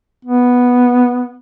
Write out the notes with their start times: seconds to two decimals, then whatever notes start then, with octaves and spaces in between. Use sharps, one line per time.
0.25 B3